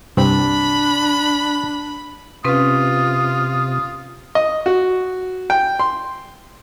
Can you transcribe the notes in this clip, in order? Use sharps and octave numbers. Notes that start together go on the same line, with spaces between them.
C2 G2 C4 D4 B5
C3 C4 C#4 F4 B4 D#6
D#5
F#4
G5
C6